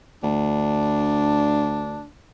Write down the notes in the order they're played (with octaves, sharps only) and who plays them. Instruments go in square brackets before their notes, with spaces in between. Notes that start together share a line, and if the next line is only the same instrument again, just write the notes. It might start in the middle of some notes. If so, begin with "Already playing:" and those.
[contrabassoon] D2 [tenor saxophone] D4